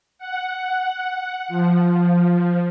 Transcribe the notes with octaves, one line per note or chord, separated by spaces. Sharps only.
F#5
F3